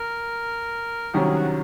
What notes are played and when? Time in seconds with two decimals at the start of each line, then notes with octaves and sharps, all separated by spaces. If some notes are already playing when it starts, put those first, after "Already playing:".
Already playing: A#4
1.14 C2 C3 D#3 F#3 C#4 G#4
1.35 F#4